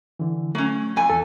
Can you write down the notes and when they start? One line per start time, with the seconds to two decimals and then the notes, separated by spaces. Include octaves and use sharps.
0.19 D3 E3
0.55 F#3 A3 C#4
0.96 F2 G#5
1.10 E2 A4